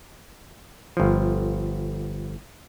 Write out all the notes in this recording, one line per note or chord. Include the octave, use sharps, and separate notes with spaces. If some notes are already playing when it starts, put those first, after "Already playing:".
G1 F3